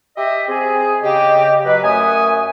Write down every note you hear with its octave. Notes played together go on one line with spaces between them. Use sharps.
G4 D#5 E5
C4 G#4
C#3 G4 D#5
F#3 B4
F#2 A3 G#5 D#6